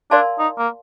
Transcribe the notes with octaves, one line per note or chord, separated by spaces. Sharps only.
D4 A#4 D5 F5 A5 C6
D#4
A#3